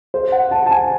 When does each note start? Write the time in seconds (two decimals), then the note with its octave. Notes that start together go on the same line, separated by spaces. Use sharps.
0.14 C5
0.32 F#5
0.51 A5
0.66 A5
0.71 G#5